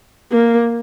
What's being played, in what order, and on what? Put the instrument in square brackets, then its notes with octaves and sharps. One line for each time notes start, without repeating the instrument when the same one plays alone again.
[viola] A#3